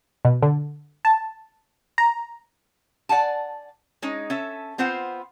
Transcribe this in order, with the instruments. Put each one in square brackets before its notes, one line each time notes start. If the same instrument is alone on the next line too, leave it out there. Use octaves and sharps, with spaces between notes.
[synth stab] B2
D3
A5
A#5
[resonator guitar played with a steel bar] D5 F#5 G#5 A5
G#3 C#4 D#4
C#4 A4 E5
B3 C4 F4 C5 F#5